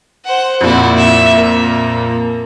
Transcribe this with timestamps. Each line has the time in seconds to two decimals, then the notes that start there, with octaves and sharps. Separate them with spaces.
0.25 C5 F#5
0.61 F2 A#2 E4 F#4
0.97 E5
1.29 A#3